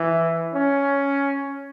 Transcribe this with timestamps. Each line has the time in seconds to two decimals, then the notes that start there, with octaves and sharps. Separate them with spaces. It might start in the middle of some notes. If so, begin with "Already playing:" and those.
Already playing: E3
0.54 C#4